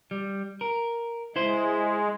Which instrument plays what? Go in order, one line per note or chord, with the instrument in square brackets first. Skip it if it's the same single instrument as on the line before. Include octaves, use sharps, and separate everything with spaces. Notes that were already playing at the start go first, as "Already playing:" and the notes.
[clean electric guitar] G3
A#4
[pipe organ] G#3 [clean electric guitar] E4 C5